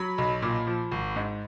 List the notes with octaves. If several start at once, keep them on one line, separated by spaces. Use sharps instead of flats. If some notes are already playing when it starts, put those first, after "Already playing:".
Already playing: F#3 B5
B1
A#2
F3
G#1
G#2